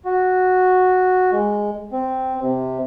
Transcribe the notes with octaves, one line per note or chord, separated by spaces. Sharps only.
F#4
G#3
C4
C3